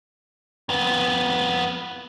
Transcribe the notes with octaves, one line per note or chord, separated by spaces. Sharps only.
F2 B3